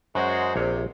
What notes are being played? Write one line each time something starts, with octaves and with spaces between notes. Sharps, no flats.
F#2 G#3 F#4 C5
A#1 C3 C#5